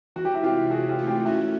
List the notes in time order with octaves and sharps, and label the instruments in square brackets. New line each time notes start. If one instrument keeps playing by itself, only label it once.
[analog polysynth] E3 [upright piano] F#4
[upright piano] G4
E4 F#4
[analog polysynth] C3 [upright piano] F4 G4
[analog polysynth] E3 [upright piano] F#4 G#4
[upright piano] F4 G4
[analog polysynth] A3
[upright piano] F4 G4
[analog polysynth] C#4 [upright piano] E4 F#4